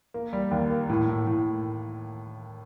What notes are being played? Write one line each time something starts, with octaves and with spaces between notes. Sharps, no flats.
A#3
G3
D#2
A#3
A2
A2
A2